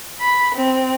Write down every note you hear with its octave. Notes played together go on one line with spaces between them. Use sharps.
B5
C4